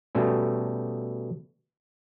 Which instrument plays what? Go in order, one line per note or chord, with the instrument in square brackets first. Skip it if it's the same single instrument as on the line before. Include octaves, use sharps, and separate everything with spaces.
[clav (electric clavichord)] B2 G3 A3 C#4